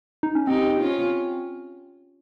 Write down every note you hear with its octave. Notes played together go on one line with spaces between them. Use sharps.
D#4
C#4
C4 D#4 G4
C#4 F4